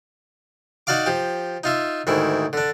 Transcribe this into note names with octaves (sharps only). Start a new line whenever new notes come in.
D#4 F#4 D5 F5 D6
F3 G4
D#4 F4 E5
D2 G#2 D#3 E4
D3 D4